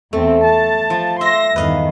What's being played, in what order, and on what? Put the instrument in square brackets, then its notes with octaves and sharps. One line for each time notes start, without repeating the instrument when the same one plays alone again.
[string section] E2 C4 [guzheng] A3
[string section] A5
[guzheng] F3
[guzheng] E5 [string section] C6 A#6
[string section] E2 G2 D#3 [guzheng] B4 D#5 F5